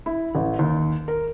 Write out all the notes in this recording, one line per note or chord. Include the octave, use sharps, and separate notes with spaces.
E4
A1
D#2
A#4